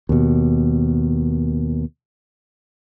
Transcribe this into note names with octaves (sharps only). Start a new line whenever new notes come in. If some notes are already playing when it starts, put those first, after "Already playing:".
D#2 B2